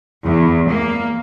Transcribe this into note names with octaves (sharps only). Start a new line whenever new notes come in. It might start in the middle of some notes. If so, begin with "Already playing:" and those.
E2
A#3